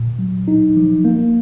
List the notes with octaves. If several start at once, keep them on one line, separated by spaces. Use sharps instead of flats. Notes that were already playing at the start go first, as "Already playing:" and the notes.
Already playing: A#2
F#3
D#4
F3
A#3